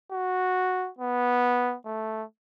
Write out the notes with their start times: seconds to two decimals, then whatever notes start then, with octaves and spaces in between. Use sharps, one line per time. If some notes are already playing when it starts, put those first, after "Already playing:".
0.12 F#4
0.98 B3
1.85 A3